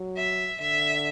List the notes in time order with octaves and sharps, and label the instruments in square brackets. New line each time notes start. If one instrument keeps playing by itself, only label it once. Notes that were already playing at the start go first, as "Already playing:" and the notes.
Already playing: [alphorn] F#3
[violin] E5
[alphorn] D3 [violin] E5